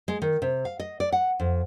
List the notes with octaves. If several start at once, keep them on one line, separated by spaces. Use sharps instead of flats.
G#3
D#3
C3
F5
D#5
D5
F#5
F2